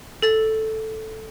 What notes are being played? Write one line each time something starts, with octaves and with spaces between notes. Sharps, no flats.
A4 A6